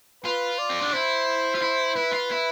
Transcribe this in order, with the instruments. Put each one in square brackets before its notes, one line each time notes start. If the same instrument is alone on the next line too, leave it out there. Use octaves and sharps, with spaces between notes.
[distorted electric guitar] F4 [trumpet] B4
[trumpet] D5
[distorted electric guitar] C4
D4
[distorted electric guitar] E4 [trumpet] C5
[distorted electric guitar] F4
E4
[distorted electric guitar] E4 [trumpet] B4
[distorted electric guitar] F4
E4